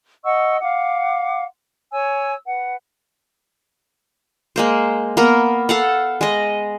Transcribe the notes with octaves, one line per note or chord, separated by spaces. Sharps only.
D#5 F#5 C#6 E6
F5 F#5 D6
C#5 G#5 E6
B4 F#5
G#3 A#3 C5
A#3 B3 A#4
A4 F5 F#5
G#3 D#5